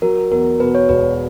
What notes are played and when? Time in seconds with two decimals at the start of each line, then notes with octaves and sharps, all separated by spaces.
0.02 F#3 A#4
0.31 E2 A#4
0.60 B2 B4
0.75 C#5
0.89 E1 B4